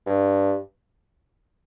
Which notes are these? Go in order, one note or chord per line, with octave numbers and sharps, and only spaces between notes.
G2